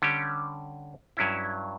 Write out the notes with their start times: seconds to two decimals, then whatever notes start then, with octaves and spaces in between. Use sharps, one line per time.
0.02 D3 G3 C#4 G4
1.17 G2 F#3 C#4 E4